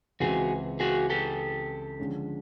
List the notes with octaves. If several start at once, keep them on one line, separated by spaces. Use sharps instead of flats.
C#2 C#3 E3 G#3 C4 F#4 G#4
F#4 G#4
G4 A4
D3 F3 G#3 C#4